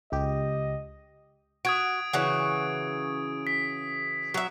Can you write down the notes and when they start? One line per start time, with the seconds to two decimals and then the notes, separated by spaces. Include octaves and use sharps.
0.12 C#2 G4 D#5
1.65 F#4 D#6 G#6 D7
2.13 C#3 E3 F#4
3.47 B6
4.34 F#3 E5